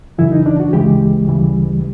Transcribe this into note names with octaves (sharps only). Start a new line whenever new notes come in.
F#2 C#3 E3 E4
D#4
D4
F#4
D2 C#3 E3 G#3 G4
D2 C#3 E3 G3